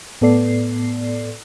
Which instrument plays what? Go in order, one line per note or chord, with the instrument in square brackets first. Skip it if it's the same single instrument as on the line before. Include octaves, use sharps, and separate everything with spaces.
[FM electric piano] A2 B3 A4 D5 C7